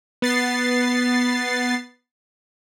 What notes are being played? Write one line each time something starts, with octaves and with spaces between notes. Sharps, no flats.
B3 A6 C7